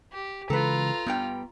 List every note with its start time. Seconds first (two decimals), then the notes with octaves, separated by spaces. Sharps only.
0.12 G4
0.50 C#3 E3 G#3 F4 A4 B4 A#5
1.07 G2 G3 B3 G5